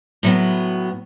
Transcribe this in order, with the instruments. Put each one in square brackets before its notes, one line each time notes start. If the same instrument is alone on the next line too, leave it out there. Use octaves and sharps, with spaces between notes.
[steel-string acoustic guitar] A2 F#3 B3